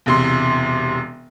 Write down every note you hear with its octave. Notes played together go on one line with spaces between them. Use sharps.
E1 C3 C6